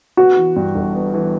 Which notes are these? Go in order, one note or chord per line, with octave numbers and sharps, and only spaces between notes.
B3 F#4
E3
G2
G1
B3
E3